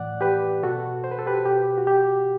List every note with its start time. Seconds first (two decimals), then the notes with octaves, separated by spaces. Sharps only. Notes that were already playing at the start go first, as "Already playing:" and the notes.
Already playing: A2 E3 D5 F#5
0.21 G4 B4
0.63 B2 F#4 A4
1.04 C5
1.12 B4
1.19 A4
1.26 G4 B4
1.46 B2 G4
1.78 F#4
1.87 G4